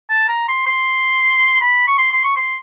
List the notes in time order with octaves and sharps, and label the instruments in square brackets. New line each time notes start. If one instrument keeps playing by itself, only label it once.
[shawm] A5
A#5
C6
C6
B5
C#6
C6
C6
C#6
C6